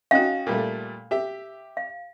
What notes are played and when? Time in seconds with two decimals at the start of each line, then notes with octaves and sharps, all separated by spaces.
0.11 C#4 D#4 F#4 F5 G5
0.47 A#2 G3 A3
1.11 G4 E5
1.77 F5